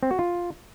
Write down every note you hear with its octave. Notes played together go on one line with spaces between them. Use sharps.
C4
F#4
F4